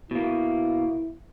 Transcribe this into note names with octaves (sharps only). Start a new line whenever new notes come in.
B2 A#3 E4